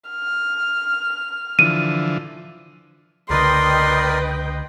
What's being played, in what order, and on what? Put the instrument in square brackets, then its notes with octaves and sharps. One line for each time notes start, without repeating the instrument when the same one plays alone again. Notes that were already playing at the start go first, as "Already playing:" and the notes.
[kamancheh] F6
[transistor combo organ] D3 E3 F3 [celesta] D#7
[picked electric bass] C#2 D3 [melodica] A#4 D5 [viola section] B4 D#5 G5 [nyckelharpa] C6